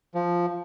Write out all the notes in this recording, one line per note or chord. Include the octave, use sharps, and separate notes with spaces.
F3